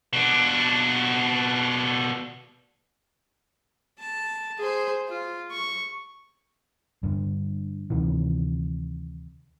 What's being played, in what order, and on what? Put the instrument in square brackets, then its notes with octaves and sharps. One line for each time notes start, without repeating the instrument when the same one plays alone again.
[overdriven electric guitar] B2 D4
[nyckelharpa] A5
G#4 C5
F4
C#6
[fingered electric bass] G2 D3
D2 C3 D#3 E3